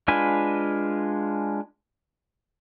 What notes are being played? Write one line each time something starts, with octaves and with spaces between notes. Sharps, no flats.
G#3 D4 F4 B4 G#5